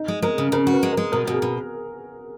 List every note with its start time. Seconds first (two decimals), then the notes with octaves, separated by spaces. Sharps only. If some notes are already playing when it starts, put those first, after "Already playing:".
Already playing: D#4
0.08 G#3
0.22 G#3 A#4
0.38 C#3
0.52 C#3 A#4
0.67 F#4
0.73 B4
0.83 G#3
0.93 G#3 A#4
1.12 B2 A#4
1.26 B2 F#4
1.33 G#4
1.42 B2